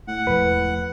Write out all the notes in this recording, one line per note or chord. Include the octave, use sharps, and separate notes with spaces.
A2 F#5
E1 F3 B4